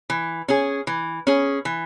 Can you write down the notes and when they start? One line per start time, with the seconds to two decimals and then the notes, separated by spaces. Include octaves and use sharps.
0.10 E3
0.48 C#4 G#4
0.87 E3
1.27 C#4 G#4
1.65 E3